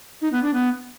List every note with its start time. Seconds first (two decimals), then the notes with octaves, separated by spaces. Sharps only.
0.22 D#4
0.32 B3
0.43 D4
0.54 B3